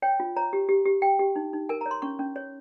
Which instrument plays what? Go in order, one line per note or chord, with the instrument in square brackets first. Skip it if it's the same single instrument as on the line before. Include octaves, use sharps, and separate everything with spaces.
[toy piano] C#5 G5
F4
C#5 A#5
G4
G4
G4
G4 G5
G4
D#4
D#4
A#4 G#5
C#5 A#5
C6
C#4 C#6
C#4
C#5